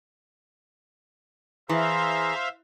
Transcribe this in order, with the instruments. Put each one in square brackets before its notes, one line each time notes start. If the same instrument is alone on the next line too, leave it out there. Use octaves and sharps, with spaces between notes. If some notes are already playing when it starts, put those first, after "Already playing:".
[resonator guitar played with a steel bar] E3 [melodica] G#4 A#5 C6 [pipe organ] C5 E5 F5